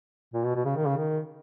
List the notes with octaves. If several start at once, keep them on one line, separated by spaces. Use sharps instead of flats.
A#2
B2
B2
C#3
D#3
C#3
D#3